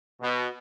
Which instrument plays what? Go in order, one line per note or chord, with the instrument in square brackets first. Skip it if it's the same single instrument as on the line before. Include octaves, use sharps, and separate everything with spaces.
[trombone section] B2